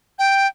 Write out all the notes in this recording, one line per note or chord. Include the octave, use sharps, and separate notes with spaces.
G5